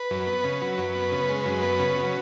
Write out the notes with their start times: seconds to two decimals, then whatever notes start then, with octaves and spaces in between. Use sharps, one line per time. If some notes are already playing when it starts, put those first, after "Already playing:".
Already playing: B4
0.11 F#2
0.27 B3
0.44 C#3
0.61 F#3
0.78 F#2
0.95 B3
1.12 C#3
1.29 G#3
1.46 F#2
1.63 B3
1.79 C#3
1.96 F#3